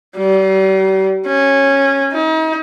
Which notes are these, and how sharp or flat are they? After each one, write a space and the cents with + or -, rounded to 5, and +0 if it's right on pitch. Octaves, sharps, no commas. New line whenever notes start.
G3 -40
C#4 -15
D#4 +40